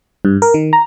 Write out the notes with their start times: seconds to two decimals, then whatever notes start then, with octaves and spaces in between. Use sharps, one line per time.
0.25 G2
0.42 A#4
0.54 D#3
0.73 A#5